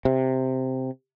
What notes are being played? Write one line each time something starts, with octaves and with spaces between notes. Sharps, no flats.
C3